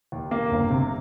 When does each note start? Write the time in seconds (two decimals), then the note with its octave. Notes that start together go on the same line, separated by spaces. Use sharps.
0.12 D#2
0.31 A#3
0.51 G1
0.70 C3